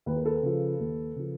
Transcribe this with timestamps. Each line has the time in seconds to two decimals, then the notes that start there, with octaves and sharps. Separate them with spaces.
0.06 D#2 B4
0.16 A#4
0.25 A4 B4
0.43 C#3 F3
0.80 D#2
1.16 C#3 F3